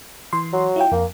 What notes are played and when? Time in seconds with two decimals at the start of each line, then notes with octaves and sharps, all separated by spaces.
0.33 E3 C6
0.53 F#3
0.76 E4 F4 G5
0.92 F2 A#3